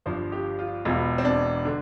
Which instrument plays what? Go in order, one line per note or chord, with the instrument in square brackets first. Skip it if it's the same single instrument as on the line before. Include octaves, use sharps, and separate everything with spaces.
[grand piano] G1 G2 F3 C5
G4
F4
E1 E2 E3 F4
C4
D4
D3